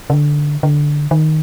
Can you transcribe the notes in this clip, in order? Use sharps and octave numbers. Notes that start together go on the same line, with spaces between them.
C#3
D3
D3
D#3